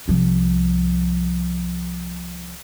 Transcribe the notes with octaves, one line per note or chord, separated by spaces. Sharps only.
C2 F3